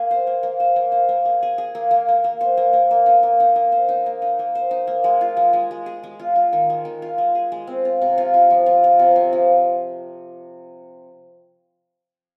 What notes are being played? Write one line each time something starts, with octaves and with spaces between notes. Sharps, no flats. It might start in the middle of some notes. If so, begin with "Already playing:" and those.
Already playing: A#3 G#4
C5
A#3
A#3
C5
A#3
C5
A#3
G#4
G#4
G#4
A#3
A#3
A#3
A#3
C5
A#3
A#3
A#3
D#4
A#3
D#4
A#3
C5
D#4
A#3
D#4
A#3
C5
D#4
A#3
G#3
F4
G#3
G#3
G#3
G#4
G#3
F4
F4
D#3
G#3
D#3
F4
G#3
G#4
G#3
C4
F4
C3
F4
F4
F3
F4
F4
C3
C4
F3